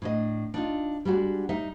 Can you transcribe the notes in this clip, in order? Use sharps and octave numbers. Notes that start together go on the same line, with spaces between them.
A2 D4 D#5
D4 D#4 F4
G3 G#3 D4 F#4
G3 D#4 E5